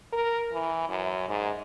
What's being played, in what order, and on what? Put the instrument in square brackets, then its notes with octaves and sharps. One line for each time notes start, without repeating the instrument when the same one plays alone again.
[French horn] A#4
E3
F#2
G#2